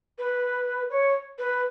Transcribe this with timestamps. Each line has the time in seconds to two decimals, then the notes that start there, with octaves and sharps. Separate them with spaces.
0.19 B4
0.90 C#5
1.39 B4